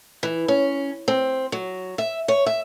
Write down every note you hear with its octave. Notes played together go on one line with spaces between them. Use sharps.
E3
C#4
C4
F#3
E5
C#5
E5